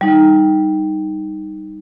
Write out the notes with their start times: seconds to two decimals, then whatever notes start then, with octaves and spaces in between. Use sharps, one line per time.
0.01 G3 D#4